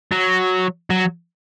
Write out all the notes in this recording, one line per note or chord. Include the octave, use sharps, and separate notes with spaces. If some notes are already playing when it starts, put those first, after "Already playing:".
F#3
F#3